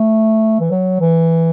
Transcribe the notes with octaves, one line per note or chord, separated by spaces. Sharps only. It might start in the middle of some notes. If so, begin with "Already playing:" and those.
Already playing: A3
E3
F#3
E3